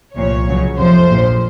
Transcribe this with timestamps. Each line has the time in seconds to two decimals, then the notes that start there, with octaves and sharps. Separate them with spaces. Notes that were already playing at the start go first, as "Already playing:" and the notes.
0.15 C2 A#2 F3 C#5
0.47 C#2 C#3 F#3
0.77 F2 C3 F3 C5
1.09 A#1 A#2 F3